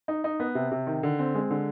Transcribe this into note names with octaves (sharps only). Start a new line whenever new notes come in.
D#4
D#4
B3
C3
C3
D#3
D3
C4
G#3
D3